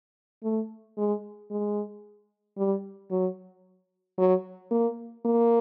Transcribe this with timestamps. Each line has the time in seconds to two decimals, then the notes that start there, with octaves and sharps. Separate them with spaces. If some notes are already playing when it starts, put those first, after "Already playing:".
0.43 A3
0.97 G#3
1.51 G#3
2.57 G3
3.11 F#3
4.18 F#3
4.71 A#3
5.25 A#3